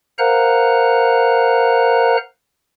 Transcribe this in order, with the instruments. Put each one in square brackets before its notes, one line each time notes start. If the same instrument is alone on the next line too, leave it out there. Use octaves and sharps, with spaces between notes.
[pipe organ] A#4 C5 F5 F#5 A#5 F#6